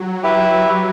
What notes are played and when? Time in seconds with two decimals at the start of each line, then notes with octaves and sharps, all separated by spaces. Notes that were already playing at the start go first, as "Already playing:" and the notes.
Already playing: F#3
0.23 E4 G4 B4 E5